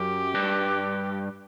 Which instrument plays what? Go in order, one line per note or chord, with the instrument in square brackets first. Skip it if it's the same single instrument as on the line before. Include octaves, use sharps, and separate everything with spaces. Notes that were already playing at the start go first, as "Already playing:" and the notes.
Already playing: [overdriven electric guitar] F#2 [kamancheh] G4
[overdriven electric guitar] G2